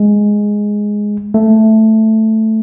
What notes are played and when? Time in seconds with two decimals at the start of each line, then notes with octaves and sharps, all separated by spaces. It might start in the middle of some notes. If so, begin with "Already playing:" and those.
Already playing: G#3
1.34 A3